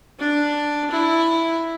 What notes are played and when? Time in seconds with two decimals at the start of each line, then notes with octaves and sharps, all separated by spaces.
0.19 D4
0.90 E4